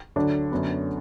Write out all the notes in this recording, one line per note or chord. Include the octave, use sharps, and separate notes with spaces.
D2 D3 F#3 A3 D4
F#2 D3 F#3 B3